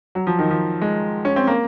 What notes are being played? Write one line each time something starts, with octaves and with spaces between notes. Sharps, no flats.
F#3
F3
D#3
F3
G#3
C#4
C4
A#3